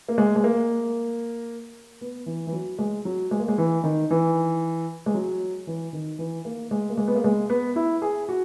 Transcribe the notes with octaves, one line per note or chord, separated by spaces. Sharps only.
A#3
G#3
G#3
A#3
B3
E3
E3
F#3
G#3
F#3
G#3
A#3
G#3
E3
D#3
E3
G#3
F#3
E3
D#3
E3
A#3
G#3
A#3
G#3
B3
A#3
G#3
B3
E4
G#4
F#4